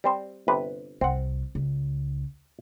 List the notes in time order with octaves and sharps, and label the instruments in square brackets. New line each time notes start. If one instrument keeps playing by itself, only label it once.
[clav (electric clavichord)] G3 C4 C5
G1 C3 B4
[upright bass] C2 [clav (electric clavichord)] C4 F#5
[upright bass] C#2